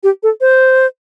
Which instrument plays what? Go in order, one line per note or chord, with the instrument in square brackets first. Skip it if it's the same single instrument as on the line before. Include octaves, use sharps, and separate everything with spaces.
[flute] G4
A4
C5